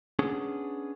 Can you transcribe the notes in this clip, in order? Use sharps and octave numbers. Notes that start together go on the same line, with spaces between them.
B3 C#4 D4 G#4